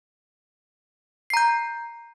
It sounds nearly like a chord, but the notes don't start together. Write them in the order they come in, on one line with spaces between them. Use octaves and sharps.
C7 A#5 G6